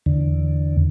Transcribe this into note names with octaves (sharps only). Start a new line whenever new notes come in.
E2 D3